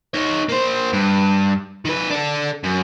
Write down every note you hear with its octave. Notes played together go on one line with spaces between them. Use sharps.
D#4 C#5
A#3 C5
G2
D#3 B4
D4 A4
F#2